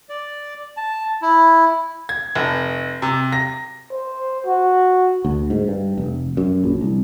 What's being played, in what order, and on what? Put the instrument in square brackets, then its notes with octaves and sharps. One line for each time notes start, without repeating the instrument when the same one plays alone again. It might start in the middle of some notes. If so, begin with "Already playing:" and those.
[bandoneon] D5
A5
E4
[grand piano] G#6
F1
C3
A#6
[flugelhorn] C5
F#4
[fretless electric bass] D2
G#2
G2
F1
F#2
A#1
C2